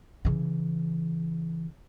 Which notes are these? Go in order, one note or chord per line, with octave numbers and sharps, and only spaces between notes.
C#3 E3